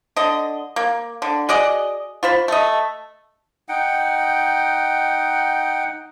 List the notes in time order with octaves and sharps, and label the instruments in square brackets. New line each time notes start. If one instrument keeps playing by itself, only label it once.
[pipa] D3 D#5
A#3
D3
F#4 G#4 D5 D#5
F4 C5 B5
A3 D#5
[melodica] D#4 F#5 G5